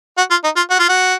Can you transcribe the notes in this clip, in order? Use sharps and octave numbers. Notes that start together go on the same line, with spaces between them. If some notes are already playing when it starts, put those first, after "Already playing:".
F#4
F4
D#4
F4
F#4
F4
F#4